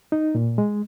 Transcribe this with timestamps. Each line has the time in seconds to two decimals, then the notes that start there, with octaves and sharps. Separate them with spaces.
0.12 D#4
0.35 A#2
0.58 G#3